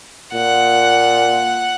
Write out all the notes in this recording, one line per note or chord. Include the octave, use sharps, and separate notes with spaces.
A#2 F#5